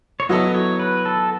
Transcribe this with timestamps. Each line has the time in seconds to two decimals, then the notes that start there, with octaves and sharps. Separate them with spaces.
0.20 C#5
0.29 F#3 B3 E4 A4 D#5
0.55 C#5
0.80 B4
1.05 A4